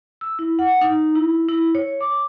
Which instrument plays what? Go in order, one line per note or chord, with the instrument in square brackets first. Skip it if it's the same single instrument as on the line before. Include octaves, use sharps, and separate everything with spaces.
[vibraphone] E6
E4
F#5
D#4
E4
E4
C#5
D6